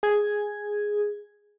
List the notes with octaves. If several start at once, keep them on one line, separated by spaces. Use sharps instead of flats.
G#4 G#6